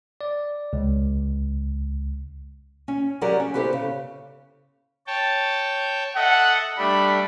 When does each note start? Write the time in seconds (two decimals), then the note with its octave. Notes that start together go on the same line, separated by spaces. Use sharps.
0.21 D5
0.73 C#2
2.88 C#4
3.21 F#3 G4 G#4 A#4 D5 F#5
3.40 C#4
3.54 B3 E4 G4 A4 C5
3.73 C#3
5.07 C#5 G5 A5
6.15 A4 D#5 E5 F#5
6.78 G3 A3 D4 B5